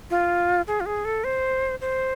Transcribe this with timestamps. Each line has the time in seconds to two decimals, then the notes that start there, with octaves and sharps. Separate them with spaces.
0.10 F4
0.67 G#4
0.80 F4
0.86 G#4
1.05 A4
1.24 C5
1.81 C5